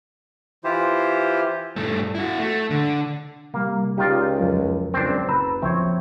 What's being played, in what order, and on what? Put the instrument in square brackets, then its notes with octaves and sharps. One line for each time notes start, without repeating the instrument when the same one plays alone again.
[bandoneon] E3 E4 F4 G4 C5
[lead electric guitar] G2 A3
E4 F#4
A3
D3
[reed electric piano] C3 G3 [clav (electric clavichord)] A#3
[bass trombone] C#2 [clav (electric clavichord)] D#4 F4 D5 [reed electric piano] G4 G5
[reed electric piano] F2 F#3 A#4
[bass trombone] C#2 [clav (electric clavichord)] C4 D4
[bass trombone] F#1 [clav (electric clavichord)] B4 [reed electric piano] A#5 E6
[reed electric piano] C#2 F3 E5 [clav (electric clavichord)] C4 C#5